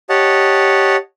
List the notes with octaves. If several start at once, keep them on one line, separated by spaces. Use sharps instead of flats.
G4 C#5 D#5 F#5 A5